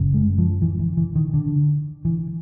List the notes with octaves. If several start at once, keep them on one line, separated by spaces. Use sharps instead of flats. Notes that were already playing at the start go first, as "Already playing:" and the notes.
Already playing: F#1 F#2 C#3
G#3
F3
E3
E3
E3
D#3
D3
E3